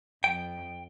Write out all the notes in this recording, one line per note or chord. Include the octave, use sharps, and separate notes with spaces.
F2 G5